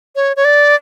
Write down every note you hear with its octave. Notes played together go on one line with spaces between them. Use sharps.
C#5
C#5
D5